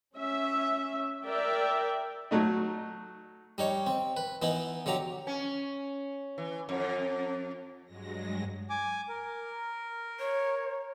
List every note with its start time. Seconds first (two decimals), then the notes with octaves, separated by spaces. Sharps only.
0.15 C#4 E5
1.25 A#4 D5 E5 G5
2.31 F#3 A3 D#4
3.58 G3 D#4 C#5
3.86 C4
4.17 B4
4.42 E3 B3 D#4 E4
4.86 D3 F#3 G4 A#5
5.27 C#4
6.38 E3
6.69 F2
7.85 G2 F#3 G#3 A#6
8.70 G#5 D6
9.09 A#4
10.19 C#5